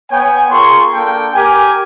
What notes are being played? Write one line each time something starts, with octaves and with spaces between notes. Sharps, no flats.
B3 C#5 G5 G#5
F4 G#4 A#4 C6 C#6
A#3 D4 A4 G5
G4 A#4 G#5